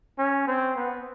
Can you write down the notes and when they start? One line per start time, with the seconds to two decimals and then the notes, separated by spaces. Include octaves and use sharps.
0.19 C#4
0.47 C4
0.76 B3